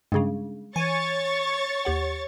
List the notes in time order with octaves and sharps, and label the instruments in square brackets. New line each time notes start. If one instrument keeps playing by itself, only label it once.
[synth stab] G2 C#3 [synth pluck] G#3 G#4 F5
[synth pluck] E3 [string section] C#5 C#6 A6 [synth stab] G#5
[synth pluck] D#2 G4 F#5